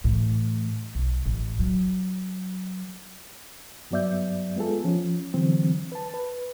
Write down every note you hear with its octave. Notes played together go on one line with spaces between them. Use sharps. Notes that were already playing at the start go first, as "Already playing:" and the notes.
A2 E3
B1
A1
F#3
G2 F#3 B3 D5 E5 G6
G#3 B3 F4 G#4 A4
F3 C#4
D3 E3 F#3 C4
B4 A5
B4